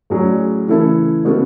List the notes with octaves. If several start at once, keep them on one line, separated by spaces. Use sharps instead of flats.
A2 F#3 C#4 G#4 D5
C#3 E3 A3 E4 A4
C#3 G#3 B3 F#4 A4